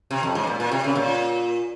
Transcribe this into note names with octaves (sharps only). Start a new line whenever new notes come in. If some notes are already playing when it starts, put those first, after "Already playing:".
C3
F2
G#2
A#2
A#2
C3
C#3
A#2